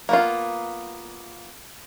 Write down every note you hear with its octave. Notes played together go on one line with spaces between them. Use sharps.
A#3 B3 F4